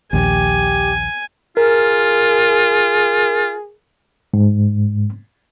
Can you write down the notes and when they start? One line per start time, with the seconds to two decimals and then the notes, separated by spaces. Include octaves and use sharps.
0.13 A#1 D#2 G4 G#5
1.57 F4 G#4 A#4
4.34 G#2